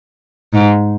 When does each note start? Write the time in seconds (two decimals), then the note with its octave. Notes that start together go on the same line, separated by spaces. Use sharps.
0.54 G#2